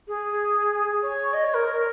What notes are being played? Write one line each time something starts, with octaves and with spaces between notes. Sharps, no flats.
G#4
C#5
D#5
C#5
A#4